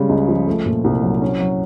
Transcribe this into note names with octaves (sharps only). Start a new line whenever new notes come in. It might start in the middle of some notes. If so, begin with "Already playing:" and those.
Already playing: C#3 G3 G#3
C#2
F3
A3
A#2
C2
F#3
C#4
F#3